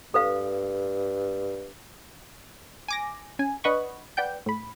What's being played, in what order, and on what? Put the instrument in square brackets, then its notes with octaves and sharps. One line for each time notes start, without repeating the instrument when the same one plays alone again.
[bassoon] G2 [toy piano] A4 B4 F5
[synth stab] G#5 D6 A#6
C#4 G#5
D4 B4 D#5 F#5 B5 C#6
B4 D5 F#5 G5 G6
A2 B5